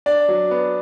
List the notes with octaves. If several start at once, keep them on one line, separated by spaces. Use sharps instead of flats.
D4 D5
F#3
B3